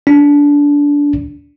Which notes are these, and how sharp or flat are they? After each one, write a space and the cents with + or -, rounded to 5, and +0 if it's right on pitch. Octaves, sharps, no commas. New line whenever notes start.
D4 -20